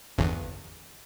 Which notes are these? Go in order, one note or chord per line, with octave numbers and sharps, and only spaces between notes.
G1 E2